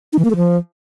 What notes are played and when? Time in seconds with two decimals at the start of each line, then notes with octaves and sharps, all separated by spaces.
0.13 D#4
0.19 E3
0.25 A#3
0.30 A3
0.36 F3